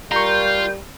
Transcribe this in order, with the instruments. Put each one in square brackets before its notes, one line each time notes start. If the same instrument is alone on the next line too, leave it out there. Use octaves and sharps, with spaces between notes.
[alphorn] G3 [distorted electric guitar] F4 [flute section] A#4 G6 [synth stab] A#5 C#6